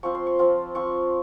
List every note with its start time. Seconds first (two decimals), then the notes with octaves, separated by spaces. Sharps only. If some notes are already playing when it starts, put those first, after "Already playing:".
0.03 F3 C4 F4 C#6
0.15 C6
0.27 C#6
0.39 F3 C4 F4
0.75 F3 C4 F4 C#6